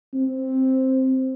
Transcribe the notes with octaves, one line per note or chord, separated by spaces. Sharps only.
C4